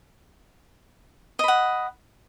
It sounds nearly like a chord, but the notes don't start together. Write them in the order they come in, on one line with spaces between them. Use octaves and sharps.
D#5 B5 F#5